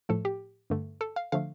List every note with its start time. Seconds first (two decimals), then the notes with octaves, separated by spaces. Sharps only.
0.09 A2 F3 A3 A4
0.25 G4
0.70 G2 D3 A3
1.01 A4
1.16 F5
1.32 D3 F3 A3 F5